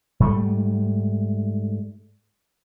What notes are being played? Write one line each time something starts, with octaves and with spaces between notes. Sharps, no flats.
G#2 G3 A3